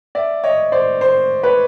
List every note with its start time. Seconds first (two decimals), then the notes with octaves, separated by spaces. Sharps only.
0.15 D5 E5
0.44 C#5 D#5
0.72 C5 D5
1.01 C5
1.43 B4 C#5